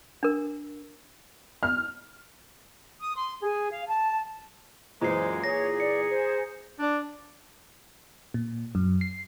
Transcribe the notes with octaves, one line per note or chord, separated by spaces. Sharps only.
D4 A#4
F6
D#6
C6
G#4
F5
A5
F#2 A#2 E3 G#3 C5 A#5 C7
G#4 C#5 A#6
D5 C#7
C5
D4
A#2
F#2
C7